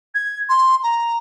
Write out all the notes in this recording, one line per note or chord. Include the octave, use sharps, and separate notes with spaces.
G#6
C6
A#5